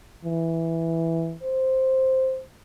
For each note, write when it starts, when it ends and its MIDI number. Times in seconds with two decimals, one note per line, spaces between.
0.25 1.36 52
1.43 2.41 72